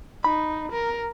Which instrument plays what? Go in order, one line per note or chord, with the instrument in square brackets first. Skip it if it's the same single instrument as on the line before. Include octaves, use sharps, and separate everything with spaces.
[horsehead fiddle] D#4 [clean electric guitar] B5
[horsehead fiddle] A#4